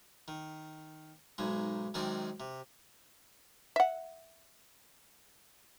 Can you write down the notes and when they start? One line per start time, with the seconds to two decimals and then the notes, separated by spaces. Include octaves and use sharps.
0.28 D#3
1.38 B1 G#2 G#3
1.94 F#2 D#3 G#3 C4 D5
2.40 C3
3.76 E5 F#5